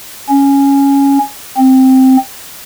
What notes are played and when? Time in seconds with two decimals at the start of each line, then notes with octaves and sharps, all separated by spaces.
0.30 C#4
1.57 C4